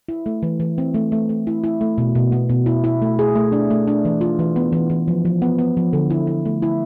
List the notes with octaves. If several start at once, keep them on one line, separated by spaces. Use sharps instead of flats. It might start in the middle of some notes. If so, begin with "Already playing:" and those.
E4
A3
E3
E3
C4
A3
A3
A3
E4
E4
A3
B2
B2
B3
B2
E4
E4
A3
G#4
A3
D4
A3
D4
E3
F4
E3
B3
E3
E3
F3
F3
B3
B3
F3
D3
E4
E4
A3
E4